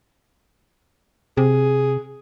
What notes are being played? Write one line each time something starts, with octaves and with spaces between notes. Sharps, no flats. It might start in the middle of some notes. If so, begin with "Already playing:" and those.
C3 G#4